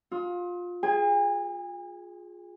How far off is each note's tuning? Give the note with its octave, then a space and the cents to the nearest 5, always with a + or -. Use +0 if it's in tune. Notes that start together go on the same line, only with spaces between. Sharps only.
F4 +20 D#6 +40
G#4 +0 G#5 -45